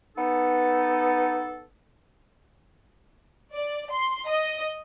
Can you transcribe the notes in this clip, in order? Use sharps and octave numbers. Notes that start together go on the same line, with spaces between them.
B3 D#4 A4
D5
C6
D#5